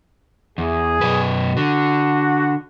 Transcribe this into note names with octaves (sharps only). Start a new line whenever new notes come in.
E2 G#4
F#2 B2 B4
D3 F#4